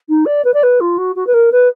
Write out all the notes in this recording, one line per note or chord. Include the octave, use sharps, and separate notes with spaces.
D#4
D5
B4
D5
B4
F4
F#4
F#4
B4
A#4
B4